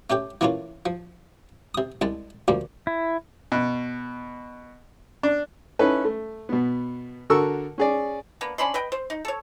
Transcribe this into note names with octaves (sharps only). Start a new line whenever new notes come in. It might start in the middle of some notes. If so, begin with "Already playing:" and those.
A3 C#4 G4 G5
E3 A3 A#3 C#4 F4
F3
C3 D#6
C2 G#3 A5
D2 F3 G3 A#3
E4
B2
D4
C#4 D#4 E4 A4 B4
A3
B2 B3
D3 F#4 A4 A#4 C#6 E6
C#4 G#4 D5
A#3 B3 D4
C#4 D4 B5 C6
B4 D#5 G5
C5
D#4
A4 C#5